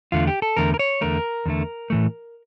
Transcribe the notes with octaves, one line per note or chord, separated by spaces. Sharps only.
E2 D3 A3 F4
G4
A4
E2 D3 A3 A#4
A#4
C#5
E2 D3 A3 A#4
E2 D3 A3
A2 E3 A3